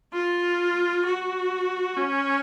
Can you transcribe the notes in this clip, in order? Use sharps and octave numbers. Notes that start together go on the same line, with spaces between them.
F4
F#4
C#4